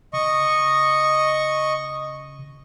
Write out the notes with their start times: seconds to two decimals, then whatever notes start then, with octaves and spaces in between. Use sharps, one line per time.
0.13 C#3 D#5 C#6